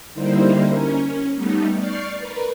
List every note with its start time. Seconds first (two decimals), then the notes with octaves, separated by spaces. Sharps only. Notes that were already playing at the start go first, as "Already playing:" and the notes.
0.14 D3 G3 A#3 D#4 E4 C5
0.67 C#4 A#4
1.00 C#4
1.35 G3 A3 B3 D#4
1.77 D5 C#6 F6 G6 A6 C7
2.18 A#4 B4